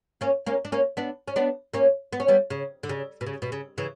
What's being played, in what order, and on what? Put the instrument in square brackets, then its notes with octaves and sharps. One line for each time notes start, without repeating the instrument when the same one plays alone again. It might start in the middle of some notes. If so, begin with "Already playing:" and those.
[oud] A#3 C#4
A#3 C#4
D4
A#3 C#4
B3 D4
C#4
B3 D4
A#3 C#4
B3
C#4
G3 B3
C#3
D3
C#3
B2
C#3
B2
C#3
C#3 E3